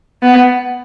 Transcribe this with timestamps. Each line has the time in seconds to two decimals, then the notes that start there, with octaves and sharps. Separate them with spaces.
0.23 B3